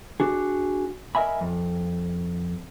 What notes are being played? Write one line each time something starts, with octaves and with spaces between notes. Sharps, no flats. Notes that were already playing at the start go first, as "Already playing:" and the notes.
D4 F#4 G#4
A#4 D#5 E5 G#5 B5
F2